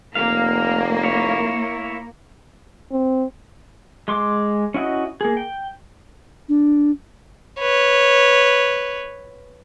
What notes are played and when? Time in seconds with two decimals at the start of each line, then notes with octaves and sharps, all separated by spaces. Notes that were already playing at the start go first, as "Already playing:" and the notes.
0.15 F1 A#3 F5
1.03 E4 C#5
2.91 C4
4.08 G#3 C6 D6
4.74 C#4 E4 F#4 D#5
5.21 A#3 G#4
5.37 G5
6.48 D4
7.60 B4 C#5